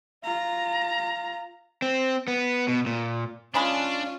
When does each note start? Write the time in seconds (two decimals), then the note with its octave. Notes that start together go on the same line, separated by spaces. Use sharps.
0.24 F4 A#5
1.82 C4
2.28 B3
2.68 B2
2.86 A#2
3.54 C#3 G#3 C#4 D4 F4 B5